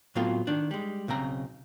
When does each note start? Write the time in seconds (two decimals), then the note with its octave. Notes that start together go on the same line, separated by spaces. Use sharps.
0.15 A2 F#3 B3 C4 F4 A4
0.47 D#3 D4
0.71 G3 G#3
1.08 B1 C#3 C4 A#5